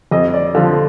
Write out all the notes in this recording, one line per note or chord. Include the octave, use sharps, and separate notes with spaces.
F2 D#5
D5
D3 F3 F5